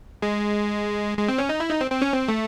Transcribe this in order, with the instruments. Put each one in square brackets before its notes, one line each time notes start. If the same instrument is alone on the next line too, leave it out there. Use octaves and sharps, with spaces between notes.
[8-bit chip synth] G#3
G#3
C4
C#4
D#4
E4
D#4
C4
C4
C#4
C4
A3